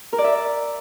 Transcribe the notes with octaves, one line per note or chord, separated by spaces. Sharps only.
A#4
D5
E5